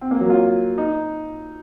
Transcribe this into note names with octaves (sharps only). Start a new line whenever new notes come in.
C4
A#3
F#3
F4
D#4